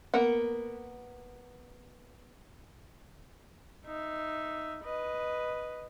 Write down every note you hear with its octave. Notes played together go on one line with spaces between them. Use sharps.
A#3 B3 A#4 F#5
D#4 E5
B4 D#5